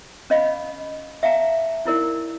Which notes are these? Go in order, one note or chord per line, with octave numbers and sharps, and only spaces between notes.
C#4 D#5 F5 B5
E5 F5 G5 A5 A#5
D#4 E4 A#4 D5